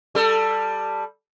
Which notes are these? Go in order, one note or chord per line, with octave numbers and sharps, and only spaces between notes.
G3 A4